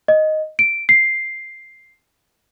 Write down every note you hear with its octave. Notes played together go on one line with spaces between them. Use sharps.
D#5
D7
C7